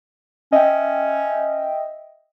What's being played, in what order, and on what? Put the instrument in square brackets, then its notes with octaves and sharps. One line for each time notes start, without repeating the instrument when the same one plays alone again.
[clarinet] C#4 [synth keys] D#5 E5 G5